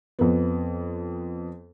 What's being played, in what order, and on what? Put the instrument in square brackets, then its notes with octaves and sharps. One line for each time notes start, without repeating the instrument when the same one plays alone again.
[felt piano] F2 B3